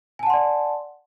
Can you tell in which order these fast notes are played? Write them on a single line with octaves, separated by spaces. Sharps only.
G#5 A5 F#5 C6 D5